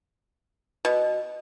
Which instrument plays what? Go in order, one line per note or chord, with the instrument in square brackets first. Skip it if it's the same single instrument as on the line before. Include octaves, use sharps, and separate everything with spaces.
[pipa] B2